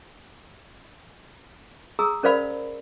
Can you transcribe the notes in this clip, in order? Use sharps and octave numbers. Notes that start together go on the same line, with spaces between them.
G#4 A#5 D#6 E6
C#4 A#4 C5 D5 F5 B5